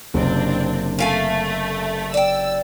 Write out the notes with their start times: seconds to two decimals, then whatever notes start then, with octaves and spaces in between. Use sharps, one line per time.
0.14 F#1 C3 C4 D4
0.99 A3 C#4 F5 G#5
2.14 D5 G5 E6